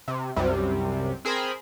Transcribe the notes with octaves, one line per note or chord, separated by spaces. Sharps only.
C3
C2 F#2 C3 G3
C4 G#4 A#4 C5 B5